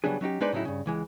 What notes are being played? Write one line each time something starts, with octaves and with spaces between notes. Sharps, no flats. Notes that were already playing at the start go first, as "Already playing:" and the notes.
C#3 F#3 G3 B3 D4 G#4
F#3 C#4 D#4 G4
G#3 D4 D#4 B4 C5 D5
A2 C#3 F#3 D#4 E4
G2 C#3
C#2 E3 G#3